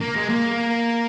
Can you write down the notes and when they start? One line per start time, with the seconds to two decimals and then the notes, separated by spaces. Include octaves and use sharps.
0.01 A#3
0.16 G#3
0.29 A#3